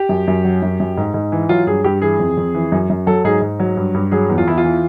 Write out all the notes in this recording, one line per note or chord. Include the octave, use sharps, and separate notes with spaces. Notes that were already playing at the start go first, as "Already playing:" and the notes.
Already playing: G4
F#2
F#2
F#3
F#2
F#2
G#2
G#2
E3
F#3 F4
G2 G#4
G2 G4
E3 G#4
F2
F2
E3
F#2
F#2
F#3 A4
G#2 G#4
G#2
F#3
G2
G2
F#3 G#4
E2
F4
E2 E4
F4
E3